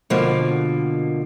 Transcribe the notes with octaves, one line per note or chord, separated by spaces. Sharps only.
B2 D3 F3 A#3